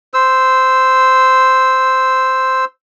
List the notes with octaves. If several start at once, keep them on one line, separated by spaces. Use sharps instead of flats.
C5 E6